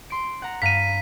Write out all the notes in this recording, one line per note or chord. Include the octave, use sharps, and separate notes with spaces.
C6 D7
F#5 A#5
G2 F5 A#5 B6 D#7